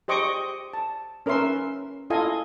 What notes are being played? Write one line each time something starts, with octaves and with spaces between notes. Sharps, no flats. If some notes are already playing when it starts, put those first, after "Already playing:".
G4 C5 D#5 C#6 D6
A5
C#4 A#4 B4 E5 C6
E4 F4 A4 D#5 F5 G#5